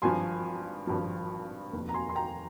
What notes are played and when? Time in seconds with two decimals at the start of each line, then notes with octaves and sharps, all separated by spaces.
0.02 G#1 G2 F3 G#5 C6
0.87 G#1 G2 F3
1.73 F1 D#2 D#3
1.89 A#5
1.94 G#5 C6
2.09 C6
2.15 G5 A#5